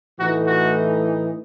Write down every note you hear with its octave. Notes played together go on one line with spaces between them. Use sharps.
A2 E3 A3 D#4 F#4
F#4